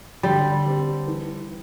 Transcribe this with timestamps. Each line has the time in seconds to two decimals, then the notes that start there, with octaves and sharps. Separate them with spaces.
0.23 D3 G3
0.65 C4 G4
1.07 E3